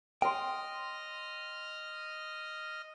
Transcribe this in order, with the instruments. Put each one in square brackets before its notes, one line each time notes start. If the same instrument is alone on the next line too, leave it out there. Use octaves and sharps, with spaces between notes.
[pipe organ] D#5 F6 [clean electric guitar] G5 [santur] C6 D6